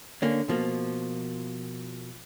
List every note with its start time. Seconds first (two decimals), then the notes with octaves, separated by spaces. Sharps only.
0.22 D3 A#3 C#4
0.49 B2 F3 A#3